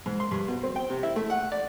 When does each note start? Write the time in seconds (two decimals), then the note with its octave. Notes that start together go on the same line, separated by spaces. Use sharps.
0.06 G#2
0.20 C6
0.31 G2
0.48 B2
0.63 C4
0.76 G5
0.90 C3
1.03 E4
1.16 A3
1.30 F#5
1.52 D5